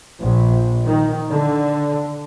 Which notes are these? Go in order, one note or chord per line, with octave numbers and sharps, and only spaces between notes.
A#1
D#3
D3